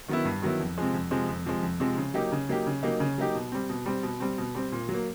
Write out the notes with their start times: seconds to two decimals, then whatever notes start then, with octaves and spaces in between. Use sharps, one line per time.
0.08 D#3 F#3 B3 E4
0.25 G2
0.42 D#3 F#3 B3 E4
0.60 F2
0.78 C3 F3 G#3
0.94 F2
1.11 C3 F3 G#3
1.29 F2
1.45 C3 F3 G#3
1.63 F2
1.80 C3 F3 G#3
1.97 C#3
2.14 F#3 A#3 D#4 G4
2.32 C#3
2.49 F#3 A#3 D#4 G4
2.67 C#3
2.83 F#3 A#3 D#4 G4
3.00 C#3
3.18 F#3 A#3 D#4 G4
3.35 B2
3.52 G3 C4
3.70 B2
3.86 G3 C4
4.03 B2
4.20 G3 C4
4.38 B2
4.55 G3 C4
4.72 A#2
4.89 F#3
4.94 A#3